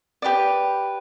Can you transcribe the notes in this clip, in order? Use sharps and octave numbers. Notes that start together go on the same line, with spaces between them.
G4 B4 D5